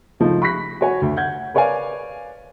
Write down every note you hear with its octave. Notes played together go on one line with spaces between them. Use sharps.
C#2 F3 A3 D#4
B5 C#6 F#6 A#6 B6
F#4 C#5 G#5
D2
F#5 G6 G#6
A#4 B4 C#5 D5 F5 G#5